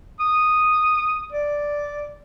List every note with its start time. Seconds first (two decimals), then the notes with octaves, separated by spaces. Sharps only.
0.20 D#6
1.33 D5